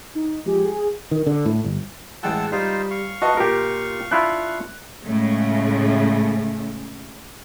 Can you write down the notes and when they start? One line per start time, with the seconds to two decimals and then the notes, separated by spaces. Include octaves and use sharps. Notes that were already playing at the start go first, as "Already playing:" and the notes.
0.15 D#4
0.45 F3 G#3 G4 G#4
0.65 G#4
1.11 D#3
1.27 D3
1.45 A2
1.64 G1
2.23 A1 G#3 F#5 G5 A5 E6
2.52 G3 D#4 F4 C5
2.91 F5 C#6
3.22 F#4 B4 D#5 A5
3.37 A#2 F4 G4 A#4
4.11 D4 E4 F4 F#6
5.03 A2 C#3 G#3 A3